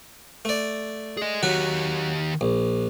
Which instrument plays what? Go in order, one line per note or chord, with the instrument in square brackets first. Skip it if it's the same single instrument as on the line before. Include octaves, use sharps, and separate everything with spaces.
[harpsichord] A3 D5
[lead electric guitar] G#4 D#5
[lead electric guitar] D#3 G4 [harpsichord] F#3 F#4
[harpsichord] A#1